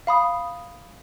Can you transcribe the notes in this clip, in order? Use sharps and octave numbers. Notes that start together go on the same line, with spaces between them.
F5 B5 D#6